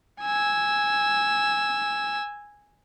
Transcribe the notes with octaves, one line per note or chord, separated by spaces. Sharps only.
G#5 E6